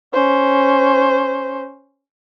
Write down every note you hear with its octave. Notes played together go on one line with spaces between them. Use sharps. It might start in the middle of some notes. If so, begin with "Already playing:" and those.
C#4 C5